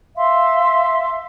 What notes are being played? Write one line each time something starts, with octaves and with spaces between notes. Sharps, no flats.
E5 F5 C6